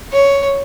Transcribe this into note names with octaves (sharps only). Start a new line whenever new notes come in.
C#5